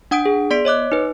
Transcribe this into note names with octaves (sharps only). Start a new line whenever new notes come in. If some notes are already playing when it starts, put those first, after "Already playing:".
D4 F#5 D#6 G6 D7
G#4
B3 D5 C6 B6 D7
C#5 D#5 D6 F#6
D#4 B4